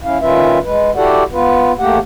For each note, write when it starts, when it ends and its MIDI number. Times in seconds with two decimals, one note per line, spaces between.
0.04 0.18 61
0.04 0.18 64
0.04 0.18 77
0.21 0.59 46
0.21 0.59 51
0.21 0.59 61
0.21 0.59 65
0.21 0.59 71
0.21 0.59 76
0.64 0.91 56
0.64 0.91 71
0.96 1.23 64
0.96 1.23 66
0.96 1.23 67
0.96 1.23 69
0.96 1.23 74
0.96 1.23 78
1.33 1.72 59
1.33 1.72 65
1.33 1.72 71
1.79 1.99 40
1.79 1.99 57
1.79 1.99 58
1.79 1.99 67
1.79 1.99 78